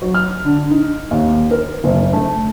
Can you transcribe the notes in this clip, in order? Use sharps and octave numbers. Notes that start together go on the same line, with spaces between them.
F#3
F6
D3
D#4
D#2
A#4
F#1
A3